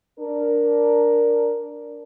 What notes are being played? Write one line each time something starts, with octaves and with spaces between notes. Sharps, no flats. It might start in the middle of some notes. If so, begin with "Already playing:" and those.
D4 A#4